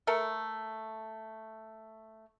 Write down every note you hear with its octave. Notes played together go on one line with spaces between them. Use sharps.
A3 A4 A#4